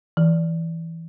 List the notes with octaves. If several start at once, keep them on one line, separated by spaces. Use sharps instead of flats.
E3